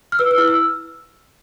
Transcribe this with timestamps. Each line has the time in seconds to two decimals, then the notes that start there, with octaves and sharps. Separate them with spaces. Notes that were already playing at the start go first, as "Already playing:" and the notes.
0.12 F6
0.19 B4 E6
0.31 E6
0.38 E4 F6
0.48 E6